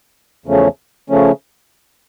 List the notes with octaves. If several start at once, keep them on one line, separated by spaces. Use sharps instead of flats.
E2 C#3 F3 A3 C#4
C#3 F3 A3 C#4